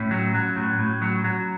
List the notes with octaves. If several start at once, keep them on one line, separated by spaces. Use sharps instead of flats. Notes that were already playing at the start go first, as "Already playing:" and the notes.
Already playing: A2 C#4
F#3
F#3
A2
A2
F#3
F#3